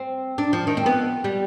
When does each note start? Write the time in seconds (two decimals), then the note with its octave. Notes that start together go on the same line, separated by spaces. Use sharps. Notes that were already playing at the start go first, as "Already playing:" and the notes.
Already playing: C4
0.38 D4
0.53 F3
0.67 D#3
0.77 C4
0.86 B3
1.24 G3